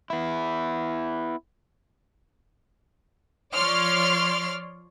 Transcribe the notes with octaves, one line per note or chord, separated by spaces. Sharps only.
B3 E4
F3 C#5 D5 C6 F6